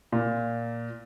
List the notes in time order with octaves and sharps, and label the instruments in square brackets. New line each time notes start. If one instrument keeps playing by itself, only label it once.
[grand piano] A#2